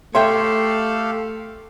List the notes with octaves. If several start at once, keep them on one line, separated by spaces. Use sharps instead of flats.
A3 G4 A4 C#5 E5 F5 G5 C6